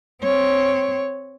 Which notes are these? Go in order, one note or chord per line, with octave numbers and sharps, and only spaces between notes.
C4 C#5